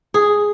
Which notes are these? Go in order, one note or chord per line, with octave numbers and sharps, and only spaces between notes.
G#4